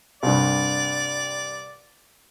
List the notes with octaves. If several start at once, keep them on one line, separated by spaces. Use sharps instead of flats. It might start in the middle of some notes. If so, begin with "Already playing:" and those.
C2 G2 D5